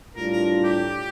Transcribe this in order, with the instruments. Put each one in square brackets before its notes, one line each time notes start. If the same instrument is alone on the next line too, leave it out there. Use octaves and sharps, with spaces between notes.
[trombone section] A2 G3 D4 F4 [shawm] A#4
[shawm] A#4
G4